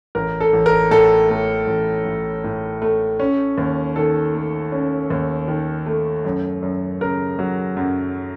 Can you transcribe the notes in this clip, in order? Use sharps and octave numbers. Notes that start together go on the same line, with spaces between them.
A1 A#4
A4
A1
A#4
A2 A4
A3
A1
A1
A2
A3
C#4
D#2
D#3 A4
A3
C#4
D#2
D#3
A3
F#2
F#2
C#3 A#4
F#3
F#2